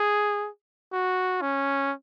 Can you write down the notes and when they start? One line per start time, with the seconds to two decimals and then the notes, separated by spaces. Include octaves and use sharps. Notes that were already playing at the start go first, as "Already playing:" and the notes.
Already playing: G#4
0.93 F#4
1.42 C#4